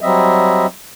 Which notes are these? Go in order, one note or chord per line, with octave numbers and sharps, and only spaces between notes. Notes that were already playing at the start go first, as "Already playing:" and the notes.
F#3 G3 C4 D#5 E5